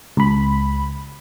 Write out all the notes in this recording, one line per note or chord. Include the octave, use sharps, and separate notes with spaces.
C#2 B5